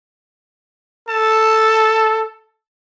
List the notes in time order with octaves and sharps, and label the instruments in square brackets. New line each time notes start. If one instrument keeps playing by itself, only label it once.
[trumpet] A4 [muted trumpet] A5